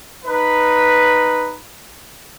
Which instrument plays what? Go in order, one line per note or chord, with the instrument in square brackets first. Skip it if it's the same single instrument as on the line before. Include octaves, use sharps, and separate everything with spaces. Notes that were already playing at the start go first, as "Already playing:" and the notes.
[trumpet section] D#4 B4